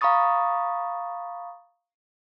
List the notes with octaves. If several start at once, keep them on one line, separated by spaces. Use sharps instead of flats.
F5 A#5 B5 C#6 D#6 A6